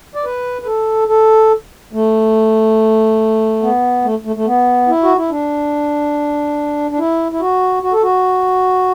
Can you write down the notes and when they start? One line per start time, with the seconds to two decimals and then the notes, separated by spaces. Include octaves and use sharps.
0.15 D5
0.24 B4
0.62 B4
0.66 A4
1.08 A4
1.93 A3
3.62 B3
4.04 A3
4.25 A3
4.36 A3
4.46 B3
4.88 E4
5.03 F#4
5.17 E4
5.30 D4
6.91 D4
6.99 E4
7.32 E4
7.41 F#4
7.83 F#4
7.93 A4
8.03 F#4